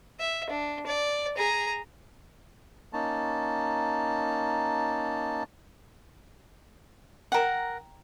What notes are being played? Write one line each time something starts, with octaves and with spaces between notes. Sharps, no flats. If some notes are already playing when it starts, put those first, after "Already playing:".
E5
D4
D5
G#4 A#5
A#3 C#4 D#4 A5
A#4 F#5 G5 A#5